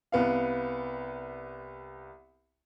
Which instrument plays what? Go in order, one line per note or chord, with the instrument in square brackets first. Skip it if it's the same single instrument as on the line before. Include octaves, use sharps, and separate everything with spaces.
[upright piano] C2 B3 F5